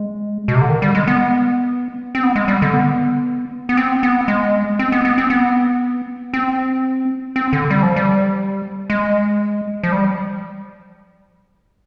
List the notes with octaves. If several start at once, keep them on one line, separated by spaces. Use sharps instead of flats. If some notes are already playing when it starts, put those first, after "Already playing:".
Already playing: G#3
B2
C3
D3
D#3
G3
G#3
B3
C4
B3
G#3
G3
D3
B3
B3
C4
B3
G#3
C4
B3
B3
C4
B3
C4
C4
D3
G3
F3
G3
G#3
F3
G3